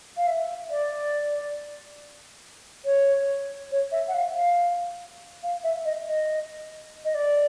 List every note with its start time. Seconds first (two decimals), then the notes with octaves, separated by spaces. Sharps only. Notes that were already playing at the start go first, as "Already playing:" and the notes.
0.17 F5
0.27 E5
0.71 D5
2.85 C#5
3.72 C#5
3.92 E5
4.08 F#5
4.14 F5
4.35 F5
5.43 F5
5.64 E5
5.85 D#5
6.07 D#5
7.05 D#5
7.15 D5